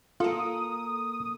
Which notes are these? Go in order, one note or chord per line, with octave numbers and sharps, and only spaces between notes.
A#3 F4 A4 D#6